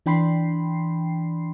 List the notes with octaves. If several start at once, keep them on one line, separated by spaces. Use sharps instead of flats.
E3 D4 G5 B5 C6 C7